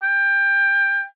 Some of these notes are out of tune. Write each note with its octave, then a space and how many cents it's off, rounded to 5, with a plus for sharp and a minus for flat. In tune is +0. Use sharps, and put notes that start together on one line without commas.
G5 +20